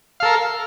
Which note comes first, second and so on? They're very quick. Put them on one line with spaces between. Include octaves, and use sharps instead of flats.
F5 A4 A#4